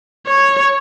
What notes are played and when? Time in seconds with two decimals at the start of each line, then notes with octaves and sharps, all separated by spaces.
0.27 C#5